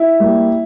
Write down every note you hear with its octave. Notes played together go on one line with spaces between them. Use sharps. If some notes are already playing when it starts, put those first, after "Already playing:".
Already playing: E4
G3 A#3